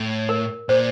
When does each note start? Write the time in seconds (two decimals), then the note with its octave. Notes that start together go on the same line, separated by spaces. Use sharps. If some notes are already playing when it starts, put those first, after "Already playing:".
Already playing: A2
0.29 A#4
0.69 A#2 C5